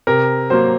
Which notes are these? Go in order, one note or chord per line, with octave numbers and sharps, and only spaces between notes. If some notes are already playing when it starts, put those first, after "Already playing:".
C3 A#4
F#3 A#3 C5